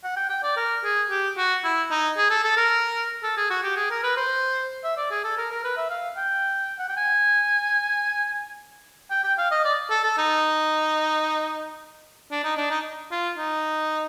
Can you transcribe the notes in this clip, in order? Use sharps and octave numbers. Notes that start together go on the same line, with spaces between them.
F#5
G5
G5
D5
A#4
G#4
G4
F#4
E4
D#4
G#4
A4
A4
A#4
A4
G#4
F#4
G4
G#4
A#4
B4
C5
E5
D5
G#4
A4
A#4
A#4
B4
E5
F5
G5
F#5
G5
G#5
G5
G5
F5
D#5
D5
A4
A4
D#4
D4
D#4
D4
D#4
F4
D#4